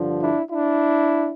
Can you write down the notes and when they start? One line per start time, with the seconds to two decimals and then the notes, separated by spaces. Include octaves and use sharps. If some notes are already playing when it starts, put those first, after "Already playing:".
Already playing: G2 D3 F3
0.20 D4 E4
0.49 D4 E4